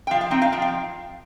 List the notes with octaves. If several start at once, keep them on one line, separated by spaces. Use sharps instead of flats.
G5
F3 F5
F5
C4 D#4 G5
F5
F3 G5
F5